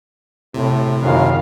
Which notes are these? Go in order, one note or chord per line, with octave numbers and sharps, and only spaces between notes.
A2 C3
F#1 F#2 D#3 F5